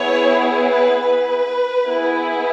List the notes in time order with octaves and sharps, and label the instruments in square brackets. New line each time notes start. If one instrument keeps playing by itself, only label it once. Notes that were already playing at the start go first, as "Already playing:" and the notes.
Already playing: [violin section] B3 E4 G#4 C#5
B4
B4
B3 E4 G#4